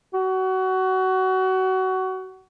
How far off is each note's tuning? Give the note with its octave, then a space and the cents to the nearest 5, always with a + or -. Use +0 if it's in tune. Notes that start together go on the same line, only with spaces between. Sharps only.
F#4 +25